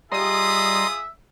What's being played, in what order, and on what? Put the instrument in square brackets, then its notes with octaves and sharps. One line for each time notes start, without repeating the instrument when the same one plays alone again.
[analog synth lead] G3 [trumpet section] F4 G#4 D#6 [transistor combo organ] D#5 A#5 C6 [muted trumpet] E5